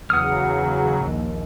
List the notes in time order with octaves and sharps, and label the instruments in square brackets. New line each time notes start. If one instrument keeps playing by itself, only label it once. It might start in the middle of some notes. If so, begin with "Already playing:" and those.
[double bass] E2 [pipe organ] C#3 F#3 [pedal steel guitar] F#5 D#6 F6
[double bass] A#1 D#2